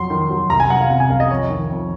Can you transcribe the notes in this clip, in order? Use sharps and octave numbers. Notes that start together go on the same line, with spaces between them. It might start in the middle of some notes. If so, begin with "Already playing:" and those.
Already playing: F2 F#3 C6
D#3
F#3
C2 A#5
G#5
C2 F#5
F5
C3 F#5
G#5
C2 F5
D#5
F2 C#5
D#3
F2